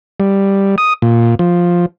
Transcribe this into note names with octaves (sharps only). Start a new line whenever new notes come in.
G3
D#6
A#2
F3